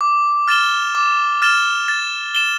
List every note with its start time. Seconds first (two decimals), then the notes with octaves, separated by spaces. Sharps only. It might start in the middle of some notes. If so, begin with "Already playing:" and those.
0.01 D6
0.48 F6 A6 E7 G7
0.95 D6
1.42 F6 A6 E7 G7
1.88 A6
2.35 E7 G7